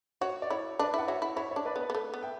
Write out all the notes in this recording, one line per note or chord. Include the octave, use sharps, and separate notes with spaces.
F#4 C#5
D5
E4 C#5
D4 B4 D5
E4 F#5
F#4 C#5 E5
E4
E4 C#5 E5
D4 C#5 E5
B4 D5
B3 B4
B3
A3 B4
B3
E5 G5